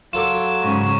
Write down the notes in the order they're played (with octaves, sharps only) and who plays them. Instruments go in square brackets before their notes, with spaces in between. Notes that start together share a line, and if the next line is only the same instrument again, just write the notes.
[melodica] F#3 [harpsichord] F4 A4 D6 [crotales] E7
[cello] G#2 C#3 [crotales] C#6